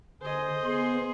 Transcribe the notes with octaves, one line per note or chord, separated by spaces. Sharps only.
D3 G#4 C5 D#5
B3 G#4 C6